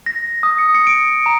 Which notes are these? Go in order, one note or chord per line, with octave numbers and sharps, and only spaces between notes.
A#6
D#6
C#7
C#7
D7
A#5